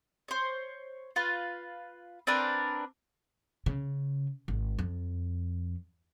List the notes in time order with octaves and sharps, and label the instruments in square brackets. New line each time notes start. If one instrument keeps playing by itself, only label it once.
[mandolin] C5 C#5
F4 B4
C4 D4 A#4 B4
[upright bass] C#3
G#1
F2